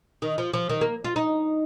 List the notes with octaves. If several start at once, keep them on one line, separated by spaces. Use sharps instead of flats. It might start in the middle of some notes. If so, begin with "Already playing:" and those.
D#3
F3
F3
D#3
A#3
F4
D#4